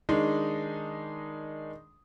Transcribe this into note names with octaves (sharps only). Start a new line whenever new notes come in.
D#3 G#3 D4 D#4